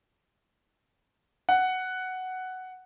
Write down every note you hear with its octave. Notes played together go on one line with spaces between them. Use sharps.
F#5